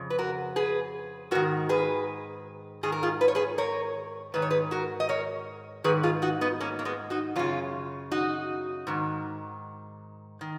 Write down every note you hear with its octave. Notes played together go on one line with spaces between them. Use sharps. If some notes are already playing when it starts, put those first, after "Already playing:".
Already playing: F2 C#3
B4
F#4 A#4
G#4 B4
G#2 D#3 F#4 A#4
G#4 B4
G#2 D#3 G#4
A#4
F4 G#4
B4
C#5
G#4 B4
A#4 C#5
G#2 D#3 B4
C#5
G#4 B4
F#4 A#4
D#5
A#4 C#5
G#2 D#3 G#4 B4
F4 G#4
D#4 F#4
B3 D#4
A#3 C#4
A#3
G#3 B3
D#4 F#4
F#2 C#3 C#4 F4
D#4 F#4
G#2 D#3
D#3